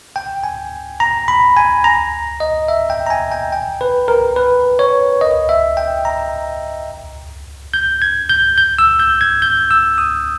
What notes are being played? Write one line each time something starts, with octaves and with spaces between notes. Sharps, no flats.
G5
G#5
A#5
B5
G#5
A#5
D#5
E5
G5
A#5
G#5
G5
G5
B4
A#4
B4
C#5
D#5
E5
G5
A#5
G6
G#6
G6
G6
E6
G6
G#6
G6
E6
D#6